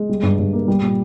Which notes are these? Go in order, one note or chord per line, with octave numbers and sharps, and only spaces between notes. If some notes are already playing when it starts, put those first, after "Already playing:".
Already playing: G#3
G3
G2
G2
A#3
G3
A#2